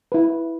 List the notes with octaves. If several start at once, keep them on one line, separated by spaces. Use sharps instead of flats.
E4 B4